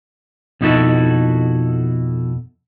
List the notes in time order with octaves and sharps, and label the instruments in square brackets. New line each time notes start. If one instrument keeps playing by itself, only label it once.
[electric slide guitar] F2 B2 D#4 E4 F#4 A4